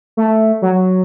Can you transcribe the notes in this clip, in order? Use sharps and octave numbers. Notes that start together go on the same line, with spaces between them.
A3
F#3